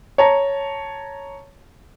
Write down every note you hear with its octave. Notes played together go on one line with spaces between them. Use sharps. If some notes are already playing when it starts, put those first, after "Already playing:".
C#5 A5 A#5